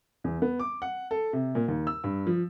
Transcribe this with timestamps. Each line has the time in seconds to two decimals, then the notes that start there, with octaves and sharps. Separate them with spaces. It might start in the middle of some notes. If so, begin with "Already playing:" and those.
0.24 E2
0.42 B3
0.60 D6
0.82 F#5
1.11 A4
1.33 C3
1.55 A#2
1.68 D#2
1.87 E6
2.04 G2
2.27 F3